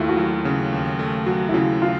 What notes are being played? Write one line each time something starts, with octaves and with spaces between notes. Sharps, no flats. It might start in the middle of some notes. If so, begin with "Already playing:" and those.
Already playing: D#2 A3 E4 F4
F#4
F#3 F4
C#3
D#2
A3
F#3 F#4
E4
C#3 F4
F4